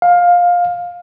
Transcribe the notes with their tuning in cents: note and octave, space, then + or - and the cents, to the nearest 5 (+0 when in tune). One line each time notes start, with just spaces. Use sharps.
F5 +15